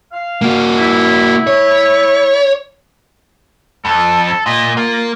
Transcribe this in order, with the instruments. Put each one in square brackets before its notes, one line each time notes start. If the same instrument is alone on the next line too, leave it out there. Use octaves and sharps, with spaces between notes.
[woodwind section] F5
[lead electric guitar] A#3 F#4
[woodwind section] E4
[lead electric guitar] C#5
[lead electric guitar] F2 [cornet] A4
[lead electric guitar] A#2 [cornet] D#5
[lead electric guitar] A#3 [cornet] F4